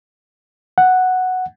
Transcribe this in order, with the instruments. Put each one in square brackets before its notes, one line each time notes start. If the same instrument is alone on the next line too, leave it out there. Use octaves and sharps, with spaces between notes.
[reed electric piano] F#5